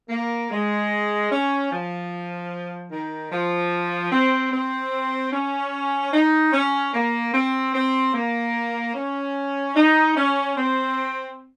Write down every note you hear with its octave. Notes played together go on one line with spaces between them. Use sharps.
A#3
G#3
C#4
F3
D#3
F3
C4
C4
C#4
D#4
C#4
A#3
C4
C4
A#3
C#4
D#4
C#4
C4